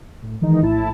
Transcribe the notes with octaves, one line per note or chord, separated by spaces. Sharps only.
A2
D#3 E3 G#3 D#4
A#1 A2 E4 A5